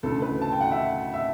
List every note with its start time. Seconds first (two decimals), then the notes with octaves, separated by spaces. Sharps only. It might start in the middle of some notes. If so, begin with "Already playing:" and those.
0.03 D2 C#3 E3 A4
0.22 B4
0.42 A5
0.52 G5
0.61 F#5
0.72 E5
1.14 E5